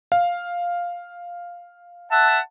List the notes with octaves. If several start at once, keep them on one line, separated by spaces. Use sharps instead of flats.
F5
E5 F#5 A5